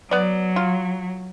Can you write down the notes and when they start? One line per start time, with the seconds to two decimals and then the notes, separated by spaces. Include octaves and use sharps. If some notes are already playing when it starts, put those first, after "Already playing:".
0.11 F#3 B3 D5
0.56 F4